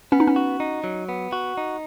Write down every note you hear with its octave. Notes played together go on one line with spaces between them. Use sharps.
B3 C#4
D#4
C#4
F#4
D#4
F#3
B3
F#4
D#4